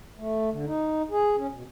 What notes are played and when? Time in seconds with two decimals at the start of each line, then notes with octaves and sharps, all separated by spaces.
0.18 A3
0.52 D3
0.66 D#4
1.10 G#4
1.38 C#4
1.50 B2